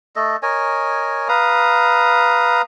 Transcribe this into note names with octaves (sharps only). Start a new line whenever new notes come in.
A3 A4 D#5
A#4 C#5 D#5 G#5
B4 F5 A#5 D#6